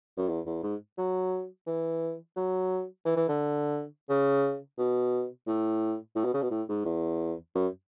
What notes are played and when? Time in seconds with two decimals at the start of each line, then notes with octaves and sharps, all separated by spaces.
0.17 F#2
0.28 E2
0.46 E2
0.63 G#2
0.98 F#3
1.67 E3
2.36 F#3
3.05 E3
3.16 E3
3.28 D3
4.09 C#3
4.78 B2
5.47 A2
6.16 A2
6.25 B2
6.34 C#3
6.42 B2
6.51 A2
6.69 G#2
6.85 E2
7.55 F#2